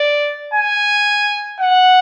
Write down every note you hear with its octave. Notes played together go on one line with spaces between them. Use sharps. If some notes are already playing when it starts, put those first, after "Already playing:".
Already playing: D5
G#5
F#5